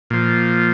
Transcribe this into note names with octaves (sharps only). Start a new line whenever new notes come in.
A#2 F3